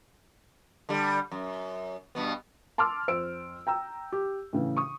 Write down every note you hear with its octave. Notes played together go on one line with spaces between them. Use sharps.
D3 G3
F#2
G2 B2 B3
A5 C6 D6 E6 F6
F2 C5 E6 D7
G5 A#5 E6
G4
A2 C#3 E3
C#6 D#6